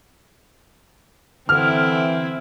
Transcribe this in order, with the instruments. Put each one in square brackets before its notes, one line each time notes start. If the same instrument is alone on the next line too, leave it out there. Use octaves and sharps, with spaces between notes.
[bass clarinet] D3 [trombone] E3 [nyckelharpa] C4 E4 [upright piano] F6